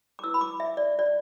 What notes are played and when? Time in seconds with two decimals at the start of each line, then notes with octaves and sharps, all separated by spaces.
0.19 D6
0.24 E4 B4 E6
0.34 B5
0.41 D6
0.60 E5
0.77 D5
0.99 D5